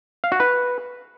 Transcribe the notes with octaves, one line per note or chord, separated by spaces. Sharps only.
F5
F#4
B4